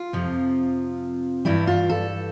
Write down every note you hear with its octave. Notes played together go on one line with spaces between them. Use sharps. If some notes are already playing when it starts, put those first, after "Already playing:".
Already playing: F4
F2 C3 F3
G2 E3 G3 E4
F4
A4